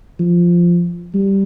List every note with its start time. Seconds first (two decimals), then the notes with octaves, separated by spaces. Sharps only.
0.19 F3
1.14 G3